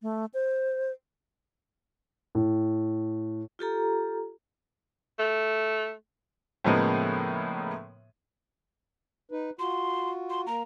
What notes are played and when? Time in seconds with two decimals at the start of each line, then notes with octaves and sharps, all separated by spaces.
0.02 A3
0.34 C5
2.35 A2
3.59 F4 G4 A4 A#5
5.19 A3
6.64 A2 C#3 F3 G#3 A#3 B3
9.32 D#4 B4
9.59 F4 F#4 C6
10.30 C6
10.47 A#3 A#5